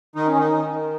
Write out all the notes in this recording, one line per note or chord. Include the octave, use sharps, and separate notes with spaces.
D#3 D#4
C#4
D#3 D#4
D#3
D#3